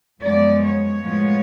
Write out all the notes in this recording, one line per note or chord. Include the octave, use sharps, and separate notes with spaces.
F#2 F3 G#3 B3 D5
C#5
A2 F3 G#3 B3